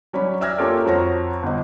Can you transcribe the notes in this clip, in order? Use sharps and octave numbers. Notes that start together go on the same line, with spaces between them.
F#3 C#4 D5 B5
D5 E5 E6 F6 G#6 A#6
A#3 C#4 F4 G4 A4
F2 F#4 C#5 A#5 A#6
G1 D#5